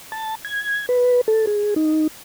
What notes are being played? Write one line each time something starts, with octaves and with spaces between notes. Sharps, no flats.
A5
G#6
B4
A4
G#4
D#4